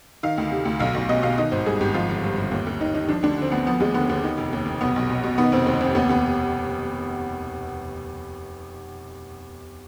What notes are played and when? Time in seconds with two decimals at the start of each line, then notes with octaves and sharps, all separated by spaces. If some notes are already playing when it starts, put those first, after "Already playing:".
0.23 D#3 F5
0.38 D2
0.51 C3
0.65 D2
0.79 B1 F5
0.94 B1
1.09 B2 D#5
1.23 B2 F5
1.38 D#3 D#5
1.52 G#1 C5
1.66 G2 G#4
1.80 G#1 G4
1.94 F3 F4
2.09 G1
2.24 G2
2.37 G1
2.51 D#2
2.67 D#2
2.80 D#3 D#4
2.95 D#3 D#4
3.09 F3 D4
3.23 D2 D4
3.38 D3 C4
3.51 D2 B3
3.66 F3 B3
3.80 D#2 G#3
3.94 D3 B3
4.09 D#2 B3
4.23 D#3
4.38 F1
4.53 D#2
4.66 F1
4.81 B1 B3
4.96 B1
5.09 B2
5.24 B2
5.38 D#3 B3
5.52 F1 C4
5.66 D#2 C4
5.81 F1 C4
5.95 D#2 B3
6.09 D#2 B3